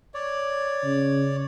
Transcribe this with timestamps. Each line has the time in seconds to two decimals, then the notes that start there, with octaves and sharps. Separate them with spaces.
0.14 C#5 D5
0.84 C#3